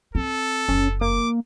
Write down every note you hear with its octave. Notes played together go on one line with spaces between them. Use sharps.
C4 A4
F#1 F2 C#4
A#3 D6